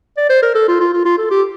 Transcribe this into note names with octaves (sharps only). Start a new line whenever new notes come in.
D5
C5
A#4
A4
F4
F4
F4
F4
A4
G4